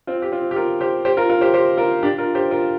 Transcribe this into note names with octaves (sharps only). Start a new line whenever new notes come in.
C4 F4
G4
C4 F4
G4
F4 A#4
G4 C5
G4 C5
F4 A#4
F4 A#4
G4 C5
G4 C5
F4 A#4
D4 G4
F4 A#4
G4 C5
F4 A#4